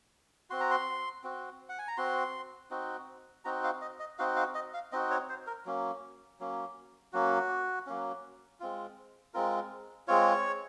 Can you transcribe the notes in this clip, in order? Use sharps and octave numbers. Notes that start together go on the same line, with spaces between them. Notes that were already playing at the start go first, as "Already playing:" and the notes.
C4 F#4 C6
A#5
C6
C4 F#4
F#5
G#5
A#5
C4 F#4 C6
C4 D#4 F#4
C4 D#4 F#4 A#5
F5
D#5
D#5
C4 D#4 F#4 F5
F5
D#5
F5
C4 D#4 F#4 D#5
C#5
C5
A#4
F#3 A#3 C#4
F#3 A#3 C#4
F#3 A#3 C#4 F#4
F#3 A#3 C#4
G#3 C4 F4
G#3 C4 F4 A#4
G#3 C4 F4 C#5